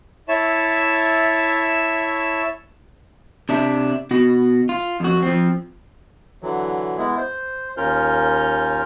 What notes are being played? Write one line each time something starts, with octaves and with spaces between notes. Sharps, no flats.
E4 C#5 E5 A5
C3 D4 E5
B2 F#4
F4
F2 F#4
F3 C4
D3 E3 F#3
G#3 B3 E4
C5
D#2 C#4 F4 A#4 F6 G6